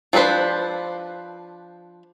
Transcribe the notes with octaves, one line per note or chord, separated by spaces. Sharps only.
F3 D4 A4 B4 C5